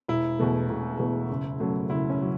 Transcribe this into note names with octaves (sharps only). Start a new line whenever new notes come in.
E1 E4
E2 B2 A3
E1
E2 B2 A3
F#1
F#2 F#3 A3
F#1 E4
C#4
F#3